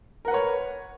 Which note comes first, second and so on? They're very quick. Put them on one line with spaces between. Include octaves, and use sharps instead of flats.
A#4 F#5 B4 C#5